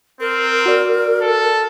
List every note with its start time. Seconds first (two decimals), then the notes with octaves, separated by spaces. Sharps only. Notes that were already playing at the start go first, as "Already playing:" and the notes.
0.21 C4 A#4
0.66 F#4 D5
1.21 A4